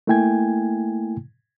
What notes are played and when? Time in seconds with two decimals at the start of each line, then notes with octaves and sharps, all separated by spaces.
0.07 A3 A#3 E4 G5 G#5 G#6